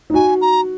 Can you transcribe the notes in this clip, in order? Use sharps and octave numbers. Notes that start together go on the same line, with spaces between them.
D#4
F#4 G#5
A#5